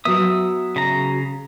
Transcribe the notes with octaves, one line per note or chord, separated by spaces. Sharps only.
F#3 B3 E5 D#6
C#3 A#5